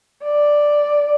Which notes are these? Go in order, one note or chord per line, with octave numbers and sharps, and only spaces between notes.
D5